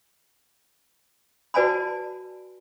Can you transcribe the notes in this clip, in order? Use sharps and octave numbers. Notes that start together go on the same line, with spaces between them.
F#4 B4 D5 G#5 A5 B5